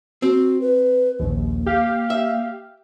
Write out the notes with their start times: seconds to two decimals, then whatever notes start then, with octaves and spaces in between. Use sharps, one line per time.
0.22 C4 F#4
0.61 B4
1.19 A#1 D#2 A#3
1.66 G4 F5
2.10 E5